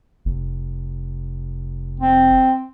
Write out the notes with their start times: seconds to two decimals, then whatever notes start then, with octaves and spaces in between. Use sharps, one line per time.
0.25 F1
2.00 C4